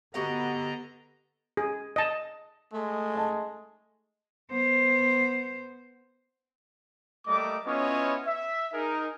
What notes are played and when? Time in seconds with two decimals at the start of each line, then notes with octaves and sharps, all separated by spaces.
0.14 D3 B3 F#4 G4 D#5 F#5 A#5
1.57 G#4
1.96 D#5 A5
2.73 G#3 A3
3.15 D#5 A5
4.51 B3 C5
7.27 G3 A3 A#3 D#5 D6
7.66 B3 C#4 E4 F4 C#5 D#5
8.26 E5
8.73 D#4 G#4 A#4